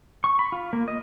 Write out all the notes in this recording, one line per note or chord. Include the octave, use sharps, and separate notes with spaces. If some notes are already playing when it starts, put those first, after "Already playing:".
C#6
B5
F4
A#3
D#5